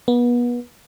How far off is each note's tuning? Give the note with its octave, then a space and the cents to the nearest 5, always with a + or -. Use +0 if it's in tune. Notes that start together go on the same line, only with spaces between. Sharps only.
B3 -30